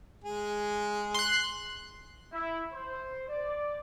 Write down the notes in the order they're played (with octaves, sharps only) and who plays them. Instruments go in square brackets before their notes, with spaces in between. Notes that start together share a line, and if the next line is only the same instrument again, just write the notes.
[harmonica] G#3 G#4
[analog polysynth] C6 F#6
[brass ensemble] E4
C5
D5